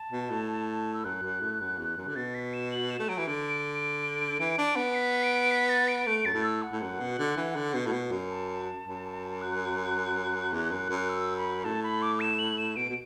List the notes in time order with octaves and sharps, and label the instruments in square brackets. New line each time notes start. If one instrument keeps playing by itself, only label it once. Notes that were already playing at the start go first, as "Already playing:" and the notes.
Already playing: [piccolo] A5
[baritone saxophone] B2
A2
[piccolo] E6
[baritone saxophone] F#2 [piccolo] F#6
[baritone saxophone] F#2
A2
F#2
E2
F#2
D3
[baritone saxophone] B2 [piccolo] A6
[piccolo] B6
E7
F#7
E7
[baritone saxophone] A3
[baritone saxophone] F#3 [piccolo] D7
[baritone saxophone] E3
[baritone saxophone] D3 [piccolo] D7
[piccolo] D7
D7
[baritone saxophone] E3
D4
B3
[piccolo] B6
D7
B6
A6
D7
[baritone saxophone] A3 [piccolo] D7
[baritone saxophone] F#2 [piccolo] A6
[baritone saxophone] A2
[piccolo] E6
F#5
[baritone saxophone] A2
F#2
B2
D3
E3
D3
B2
A2
B2
F#2
[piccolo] A5
[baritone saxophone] F#2
[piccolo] F#6
[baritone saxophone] E2
F#2
F#2
[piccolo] E6
B5
[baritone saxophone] A2 [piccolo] A5
[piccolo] B5
D6
E7
F#7
E7
[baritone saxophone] B2 [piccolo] D7
[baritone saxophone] B2